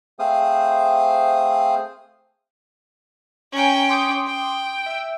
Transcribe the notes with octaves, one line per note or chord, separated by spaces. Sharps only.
A3 C4 G#4 C5 F5 D#6
C#4 G5 G#5 A#5
C6 D6 D#6
G5
E5 E6